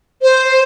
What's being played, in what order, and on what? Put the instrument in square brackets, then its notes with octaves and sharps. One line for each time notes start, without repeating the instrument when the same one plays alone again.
[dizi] C5